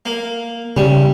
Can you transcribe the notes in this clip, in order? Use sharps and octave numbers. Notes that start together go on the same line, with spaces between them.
A#3
C#3 G3